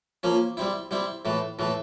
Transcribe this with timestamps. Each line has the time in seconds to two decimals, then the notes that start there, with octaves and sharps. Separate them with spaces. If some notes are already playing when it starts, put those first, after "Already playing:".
0.23 F3 A#3 C#4
0.57 G3 C4 E4
0.91 G3 C4 E4
1.25 A2 E3 A3
1.59 A2 E3 A3